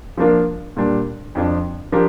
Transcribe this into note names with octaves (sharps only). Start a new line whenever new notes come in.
F3 A#3 D4 F4 A#4
A#2 G3 D4
F2 F3 D4
F3 D4 G4 A#4